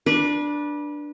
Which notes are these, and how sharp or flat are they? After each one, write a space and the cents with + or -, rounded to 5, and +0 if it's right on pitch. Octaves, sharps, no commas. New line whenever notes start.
D4 +5 B4 -30